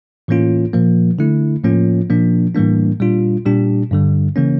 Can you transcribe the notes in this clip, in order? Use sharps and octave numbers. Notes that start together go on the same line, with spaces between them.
A2 E3 A#3 C#4 F4
A#2 F3 A#3
D3 A3 E4
A2 F3 A#3 C#4 F4
A#2 F3 A#3 D4
A2 E3 G3 A#3 D4
A#2 G3 D4 F4
A#2 G3 D4 G4
G2 D3 G3
C#3 E3 A#3 C#4